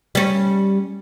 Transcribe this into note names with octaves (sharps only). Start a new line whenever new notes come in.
G3 C#4